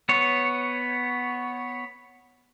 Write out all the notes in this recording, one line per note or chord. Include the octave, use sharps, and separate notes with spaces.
B3 C#5